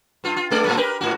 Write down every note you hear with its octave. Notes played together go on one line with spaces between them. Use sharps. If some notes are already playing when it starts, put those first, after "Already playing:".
G2 F4
F4
G2 G#3 D5
A2 G3 A#3
G4 A#4 B4
G#2 F#4